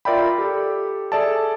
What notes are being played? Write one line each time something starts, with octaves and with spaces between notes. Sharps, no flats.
F4 A#4 D5 E5 G5 B5
G4 A4
G#4 A4 D5 E5 A5